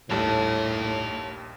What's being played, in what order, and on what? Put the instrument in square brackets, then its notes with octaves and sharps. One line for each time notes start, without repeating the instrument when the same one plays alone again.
[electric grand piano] A#1 D#2 G3 [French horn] A2 [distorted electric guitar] C#5 A5